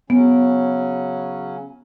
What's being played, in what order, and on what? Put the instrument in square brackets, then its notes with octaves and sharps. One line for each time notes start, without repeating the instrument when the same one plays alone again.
[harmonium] C#3 F#3 C#4 [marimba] B3